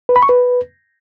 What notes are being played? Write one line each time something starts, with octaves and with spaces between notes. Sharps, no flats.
B4
B5
C#6
B4